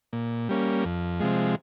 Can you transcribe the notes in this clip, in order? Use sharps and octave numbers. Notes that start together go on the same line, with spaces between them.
A#2
G3 A#3 C#4
F2
C3 F3 G#3